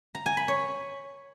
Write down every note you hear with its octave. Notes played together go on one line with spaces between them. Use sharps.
A#5
G#5
B5
C#5